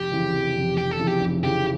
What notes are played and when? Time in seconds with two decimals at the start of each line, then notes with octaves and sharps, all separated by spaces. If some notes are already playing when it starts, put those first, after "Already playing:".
Already playing: F1 G4
0.11 F2 C#3 E3
0.33 F1
0.55 F2 C#3 E3
0.76 F1 G4
0.91 A4
0.99 F2 C#3 E3
1.07 G4
1.21 F1
1.43 F2 C#3 E3 G4